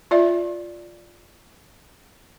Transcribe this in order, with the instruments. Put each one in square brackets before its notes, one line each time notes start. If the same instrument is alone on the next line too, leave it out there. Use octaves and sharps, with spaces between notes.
[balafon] F4 D5 E5